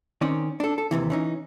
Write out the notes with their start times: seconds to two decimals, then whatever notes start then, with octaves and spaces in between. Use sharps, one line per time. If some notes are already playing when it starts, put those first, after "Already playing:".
0.21 D#3 C4 C#4 D#4 D5
0.60 D4 A4
0.78 A4
0.91 D#2 G#2 C3 E3
1.10 E3 C#4 D#4